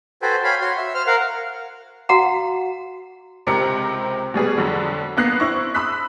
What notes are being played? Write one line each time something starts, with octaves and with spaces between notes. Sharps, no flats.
F#4 A4 B4 C5 G5 G#5
C#5 F5 G5 G#5 B5
F#4 C#5 C6
E5
C5 F6
A#4 F5 F#5
F#4 F5 F#5 A#5
C#2 C3 C4 A#4 C#7
B2 G3 G#4 B4
F2 D3 F#3
A#3 B3 F#6 A#6 C7
C4 E4 C#6
B5 D#6 E6 F#6 B6